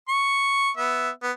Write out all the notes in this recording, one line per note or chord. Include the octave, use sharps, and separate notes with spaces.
C#6
B3 E5
B3